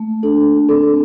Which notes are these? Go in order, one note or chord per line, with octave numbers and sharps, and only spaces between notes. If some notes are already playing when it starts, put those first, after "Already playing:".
Already playing: A3 A#3
D4 A4
C4 A4